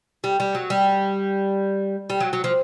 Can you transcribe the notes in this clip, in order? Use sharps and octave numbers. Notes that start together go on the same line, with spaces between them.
G3
G3
F#3
G3
G3
F#3
F#3
F3